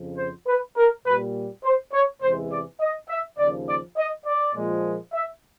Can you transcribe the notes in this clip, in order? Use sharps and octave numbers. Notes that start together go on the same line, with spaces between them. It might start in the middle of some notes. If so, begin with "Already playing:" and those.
Already playing: F2 C#3 F3
C5
B4
A#4
A#2 G3 B4
C5
C#5
E2 C3 E3 G#3 C5
D5
D#5
E5
D#2 C#3 F3 D5
D5
D#5
D5
A#2 F3 G#3
E5